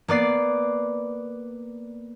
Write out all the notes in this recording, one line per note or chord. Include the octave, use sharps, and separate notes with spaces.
A#3 B3 D5 C7